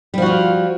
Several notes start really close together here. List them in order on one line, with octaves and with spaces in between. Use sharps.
G3 F3 F#4 F4